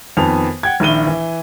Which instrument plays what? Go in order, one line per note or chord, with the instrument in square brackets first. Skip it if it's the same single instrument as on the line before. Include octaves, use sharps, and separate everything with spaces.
[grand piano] F2 D#3 B3 G#5 F7
F#5 G5 G#6
A#1 D#3 E4 D#7 G7
E3